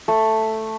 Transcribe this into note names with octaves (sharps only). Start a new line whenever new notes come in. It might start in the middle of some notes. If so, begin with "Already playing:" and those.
A3